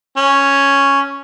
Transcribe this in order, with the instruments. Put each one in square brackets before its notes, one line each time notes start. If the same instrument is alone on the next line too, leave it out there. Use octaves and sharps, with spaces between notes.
[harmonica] C#4